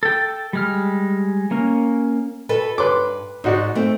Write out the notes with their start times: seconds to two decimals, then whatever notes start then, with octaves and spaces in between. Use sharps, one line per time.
0.03 A4 G5
0.53 G3 G#3 F6
1.51 A#3 C#4 A#4
2.49 F#4 A4 B4
2.78 G2 B4 C6 D6
3.44 G#2 D#4 F#4 D5
3.75 A3 C4